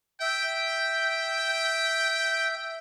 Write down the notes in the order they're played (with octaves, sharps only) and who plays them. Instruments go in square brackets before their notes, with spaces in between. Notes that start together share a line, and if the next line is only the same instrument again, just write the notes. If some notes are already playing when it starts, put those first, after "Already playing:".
[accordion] E5 [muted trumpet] G5